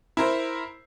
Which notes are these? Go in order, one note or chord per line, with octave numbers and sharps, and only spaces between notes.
E4 A#4 C5